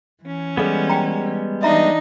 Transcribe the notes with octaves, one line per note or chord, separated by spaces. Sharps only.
E3 C#4
G3 G#3 B3 G#4 A4 F5
G5 A#5
E3 D4 D#4 D#5 E5 A#5